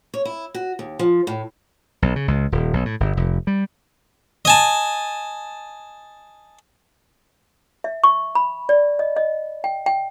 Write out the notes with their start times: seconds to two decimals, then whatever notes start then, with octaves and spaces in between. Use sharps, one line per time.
0.14 C#5
0.25 E4
0.54 F#4
0.79 D#2
0.99 F3
1.27 A2
2.02 B1
2.16 C#3
2.28 C#2
2.52 D#1
2.73 B1
2.85 A2
3.00 G1
3.17 F1
3.47 G3
4.45 D#5 G#5 A5
7.84 E5
8.04 C#6
8.35 B5
8.69 D5
8.99 D#5
9.17 D#5
9.64 G5
9.86 G5